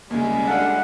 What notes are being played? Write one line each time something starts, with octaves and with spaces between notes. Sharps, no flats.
D#2 C#3 G3 G#3 E4
D4 A4 F5 F#5